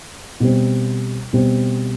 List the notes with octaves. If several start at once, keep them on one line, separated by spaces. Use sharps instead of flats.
B2 G3 C4
B2 G3 C4